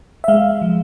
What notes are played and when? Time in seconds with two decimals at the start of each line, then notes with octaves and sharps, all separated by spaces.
0.24 E5
0.28 G#3 F5
0.62 F3